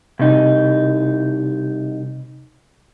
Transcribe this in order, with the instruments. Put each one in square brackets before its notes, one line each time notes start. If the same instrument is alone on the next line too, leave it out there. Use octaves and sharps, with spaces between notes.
[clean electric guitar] C2 D#4 [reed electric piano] C3